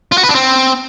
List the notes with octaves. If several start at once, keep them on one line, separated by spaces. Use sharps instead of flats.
F4
F#4
B4
D4
C4